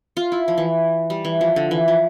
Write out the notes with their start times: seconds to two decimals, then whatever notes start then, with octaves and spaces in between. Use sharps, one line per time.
0.17 F4
0.32 E4
0.48 F3
0.58 E3
1.10 G3
1.25 E3
1.41 F3
1.56 D3
1.71 E3
1.88 F3